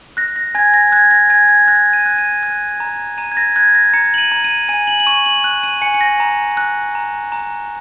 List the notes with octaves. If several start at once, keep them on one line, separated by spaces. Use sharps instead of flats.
F#6 A#6
A#6
G#5 G#6
A#6
F#6 G#6
A#6
G#5 G#6
G#6
F#6 A#6
D#7
F#6
D#7
F#6
A#5
A#5 D#7
G#6
A#6
F#6 G#6
A#6
A#5 C#7
F#7
D#7
A#5
D#7
G#5 D#7
F#7
F#7
C#6 D#7
F#7
F#6
D#7
G#5 C#7
C#7
A#6
A#5
F#6
A#5
A#5